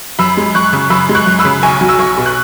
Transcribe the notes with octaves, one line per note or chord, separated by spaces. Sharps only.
F#2 B5 E6
G#3
F#2 C#6 F#6
C#3
F#2 B5 E6
G#3
C#6 F#6
F#2
B5 E6
C#3
B1 G#5 C#6
F#3
E6
B1 G#5 C#6
B2
F#6